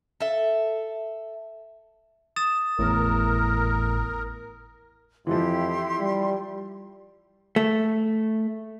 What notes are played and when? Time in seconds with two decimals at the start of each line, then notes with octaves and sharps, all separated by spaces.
0.20 A4 E5
2.36 D#6 A6 E7
2.79 G#1 E2 A2 A#4
5.27 F2 E3 F3 E4 G4 C6
6.01 G3
7.56 A3